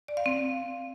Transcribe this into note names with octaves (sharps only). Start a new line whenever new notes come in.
D5
F5
C4